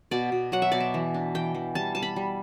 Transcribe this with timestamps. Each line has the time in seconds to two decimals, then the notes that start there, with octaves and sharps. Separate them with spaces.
0.11 B2 D5
0.32 B2
0.52 F#3 F#5
0.62 E5
0.72 B2 D5
0.80 E5
0.94 E3
1.14 D4
1.35 E3 G5
1.55 E3
1.75 G3 A5
1.95 G3 A5
2.03 B5
2.16 G3